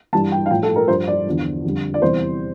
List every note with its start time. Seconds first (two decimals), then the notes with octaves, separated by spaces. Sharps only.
0.13 G2 E3 G3 A5
0.32 G5
0.46 F5
0.50 A2 F3 G5
0.63 A4
0.76 A#4
0.88 G2 F3 C5
1.08 D5
1.26 E2 D3 F3
1.64 F2 D3 G3
1.94 D5
2.02 E2 C3 E3 G3 C5